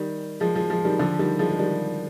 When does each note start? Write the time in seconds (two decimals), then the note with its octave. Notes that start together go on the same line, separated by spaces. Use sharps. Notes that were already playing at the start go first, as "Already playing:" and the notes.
Already playing: D#3 G3
0.40 F3 G#3
0.55 F3 G#3
0.70 F3 G#3
0.85 D#3 G3
0.99 D3 F3
1.19 D#3 G3
1.39 F3 G#3
1.50 G#3
1.58 D#3 G3